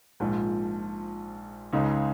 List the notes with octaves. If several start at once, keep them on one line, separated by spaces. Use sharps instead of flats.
A#1 G#2 F3
C#2 C#3 G#3 D#4